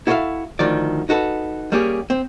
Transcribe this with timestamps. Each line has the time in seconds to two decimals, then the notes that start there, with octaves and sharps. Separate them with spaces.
0.07 E4 F#4 A4 C5 E5 F5
0.59 D2 D#3 F3 D5
1.09 D#4 F#4 A4 B4
1.72 G3 A#3 C#4 G4 G#4
2.10 C4